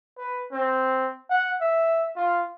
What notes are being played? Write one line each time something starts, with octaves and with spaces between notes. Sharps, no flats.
B4
C4
F#5
E5
F4